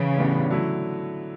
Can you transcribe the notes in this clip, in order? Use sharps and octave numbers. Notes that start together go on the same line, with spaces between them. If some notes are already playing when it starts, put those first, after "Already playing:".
Already playing: C#3 E3
A2 G3 B3 D4
D3 F#3 A3 E4